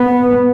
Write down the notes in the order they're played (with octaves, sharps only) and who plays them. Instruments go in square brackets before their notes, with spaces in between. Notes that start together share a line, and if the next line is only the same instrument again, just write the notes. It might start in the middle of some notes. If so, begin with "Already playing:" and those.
Already playing: [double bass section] B3